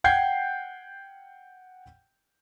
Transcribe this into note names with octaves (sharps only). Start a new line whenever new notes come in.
F#5 G5 G6 G#6 C7